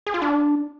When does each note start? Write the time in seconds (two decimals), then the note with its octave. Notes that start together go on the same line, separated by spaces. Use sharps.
0.07 G#4
0.14 F4
0.22 D4